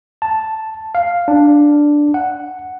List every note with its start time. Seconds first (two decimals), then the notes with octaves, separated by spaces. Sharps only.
0.22 A5
0.95 F5
1.28 D4
2.14 F#5